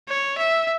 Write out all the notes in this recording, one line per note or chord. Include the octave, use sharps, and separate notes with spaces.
C#5
E5